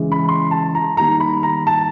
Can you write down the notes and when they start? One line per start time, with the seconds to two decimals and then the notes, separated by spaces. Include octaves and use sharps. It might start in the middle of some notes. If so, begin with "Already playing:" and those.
Already playing: C#3 E3 G#3
0.12 B5
0.29 C6
0.51 A5
0.75 A#5
0.97 D#3 G3 A#3 A#5
1.20 B5
1.43 A#5
1.67 A5